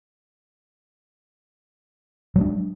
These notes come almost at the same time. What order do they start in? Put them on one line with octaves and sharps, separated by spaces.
F#3 G#3 D4